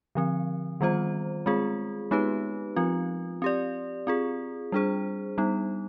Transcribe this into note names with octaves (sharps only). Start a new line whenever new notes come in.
D3 F3 C4
D#3 G3 B3 F4 C5
G#3 C4 F4 G#4
G#3 B3 D#4 G4 B4
F3 C4 F4
C4 G4 D5
C4 F4 G#4
G3 D4 G#4 C5
G3 B3 D#4